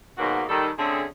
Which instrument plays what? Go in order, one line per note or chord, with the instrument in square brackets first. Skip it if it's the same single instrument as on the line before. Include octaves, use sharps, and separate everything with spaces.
[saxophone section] G#2 B2 D#3 F#3 A#3 F#4
D#3 G3 A4
D3 A3 C4 C#4 G#4